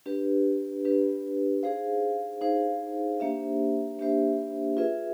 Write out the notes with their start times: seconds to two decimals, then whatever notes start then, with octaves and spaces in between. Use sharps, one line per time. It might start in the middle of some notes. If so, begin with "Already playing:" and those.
0.06 D4 G4 B4
0.85 D4 G4 B4
1.63 D#4 G#4 C5 F5
2.41 D#4 G#4 C5 F5
3.20 A#3 D4 G4 C5 E5
3.99 A#3 D4 G4 C5 E5
4.77 F4 G#4 B4 E5